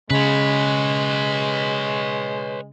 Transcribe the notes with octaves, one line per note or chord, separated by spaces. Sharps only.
C#3 G#3 B4 C#5